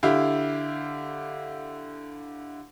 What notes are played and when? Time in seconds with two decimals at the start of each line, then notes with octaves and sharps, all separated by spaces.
0.03 D3 E4 G4 F5